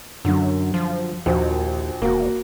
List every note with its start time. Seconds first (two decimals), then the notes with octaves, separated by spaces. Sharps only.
0.25 F#2 D3 F#3
0.74 F3
1.26 A#1 D#2 F3 F#4
2.02 E1 A#3 F#4